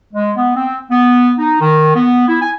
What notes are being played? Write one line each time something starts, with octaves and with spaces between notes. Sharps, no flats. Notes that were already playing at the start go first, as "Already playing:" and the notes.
G#3
B3
C4
B3
D#4
D#3
B3
E4
G#5